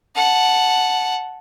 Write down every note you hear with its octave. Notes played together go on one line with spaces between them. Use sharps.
F#5 A5